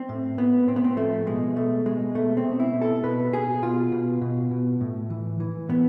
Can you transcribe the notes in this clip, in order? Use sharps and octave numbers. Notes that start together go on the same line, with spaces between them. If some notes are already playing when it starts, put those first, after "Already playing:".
Already playing: C4
A2
A2 B3
A2 C4
B3
C4
F3 A3
B2 G#3
B2 A3
B2 G#3
B2 A3
C4
B2
E4
B2
A4
B2 B4
B2 G#4
B2 F4
B2
B2
B2
A2
E3
E3
A2 B3